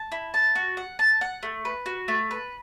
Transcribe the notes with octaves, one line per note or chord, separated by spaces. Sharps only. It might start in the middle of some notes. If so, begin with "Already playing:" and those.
Already playing: A5
E4
A5
F#4
F#5
A5
F#5
A3
B4
F#4
A3
B4